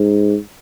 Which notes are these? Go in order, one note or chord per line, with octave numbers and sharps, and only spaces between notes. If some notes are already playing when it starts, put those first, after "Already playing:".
Already playing: G#2